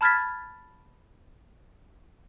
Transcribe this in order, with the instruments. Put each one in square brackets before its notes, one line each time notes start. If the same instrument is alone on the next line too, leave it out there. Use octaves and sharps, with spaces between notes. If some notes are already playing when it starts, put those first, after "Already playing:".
[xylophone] A5 B5 F6 G#6 A6 B6